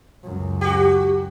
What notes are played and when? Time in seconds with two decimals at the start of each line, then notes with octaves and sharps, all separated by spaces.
0.24 C#2 F#2
0.61 F#4 G4